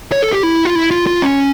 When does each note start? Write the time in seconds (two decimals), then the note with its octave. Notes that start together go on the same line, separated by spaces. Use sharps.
0.12 C#5
0.22 A4
0.33 G4
0.43 E4
0.65 F4
0.75 E4
0.91 F4
1.07 F4
1.22 C#4